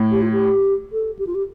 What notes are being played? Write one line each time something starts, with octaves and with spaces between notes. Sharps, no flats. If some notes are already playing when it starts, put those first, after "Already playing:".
Already playing: A2
G4
F4
G4
A4
G4
F4
G4